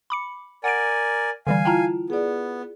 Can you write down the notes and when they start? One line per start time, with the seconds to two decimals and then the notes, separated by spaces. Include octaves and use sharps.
0.10 B5 D6 C#7
0.64 A#4 D5 F#5 G#5 D7
1.47 D3 E3 G3 F5 G#5
1.65 E4 F4 G5 A5 A#5
2.10 B3 G#4 D5